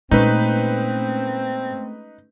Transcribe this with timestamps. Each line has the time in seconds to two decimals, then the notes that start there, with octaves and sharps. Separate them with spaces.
0.11 A#2 G#3 A3 C4 C#4 D#4 B4